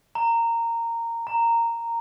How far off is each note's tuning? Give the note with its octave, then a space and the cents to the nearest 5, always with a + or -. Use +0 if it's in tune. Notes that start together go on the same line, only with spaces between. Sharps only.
A#5 -15
A#5 -10